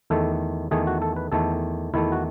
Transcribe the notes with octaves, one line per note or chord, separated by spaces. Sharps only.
E2 D#3 A3 A4
E2 D#3 A3 G#4
F#4
A4
B4
E2 D#3 A3 A4
E2 D#3 A3 E4
F#4